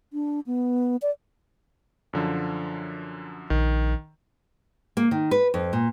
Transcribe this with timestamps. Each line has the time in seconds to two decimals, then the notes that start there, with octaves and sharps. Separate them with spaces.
0.13 D4
0.46 B3
1.02 D5
2.13 F#2 D3 F3
3.50 A#1 D#3
4.97 A#3
5.11 D#3
5.31 B4
5.54 F2
5.73 A#2